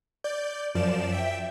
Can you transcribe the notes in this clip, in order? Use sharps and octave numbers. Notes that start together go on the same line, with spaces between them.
D5 G6
F#2 F3 D5 E7
E5 G5